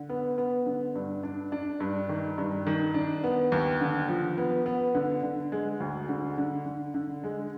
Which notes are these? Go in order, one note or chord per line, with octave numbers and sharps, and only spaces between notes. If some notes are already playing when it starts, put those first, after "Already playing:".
Already playing: D3
B3
B3
D3
G2
D4
D4
G2
D#3
G2
D#3
D4
B3
D#2
D3
F3
B3
B3
D3
D3
G#3
D2
D3
D3
D3
D3
G#3